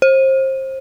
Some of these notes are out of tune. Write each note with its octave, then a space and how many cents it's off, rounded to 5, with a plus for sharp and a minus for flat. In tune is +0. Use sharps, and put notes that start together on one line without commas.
C5 +30